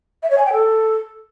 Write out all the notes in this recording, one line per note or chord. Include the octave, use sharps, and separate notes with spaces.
E5
C#5
G#5
G5
A4